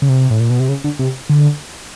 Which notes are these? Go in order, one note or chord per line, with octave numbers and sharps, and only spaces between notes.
C#3
C3
A2
A#2
B2
C3
C#3
D3
C3
D3